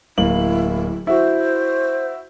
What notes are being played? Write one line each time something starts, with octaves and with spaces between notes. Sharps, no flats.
D1 A#3 E4 F#7
E4 F#4 C5